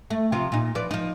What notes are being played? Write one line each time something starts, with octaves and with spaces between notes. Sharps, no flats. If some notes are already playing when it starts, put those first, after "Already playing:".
A3
C3 F3 F4
A#2 D#4
F3 B4 D5
F3 D#4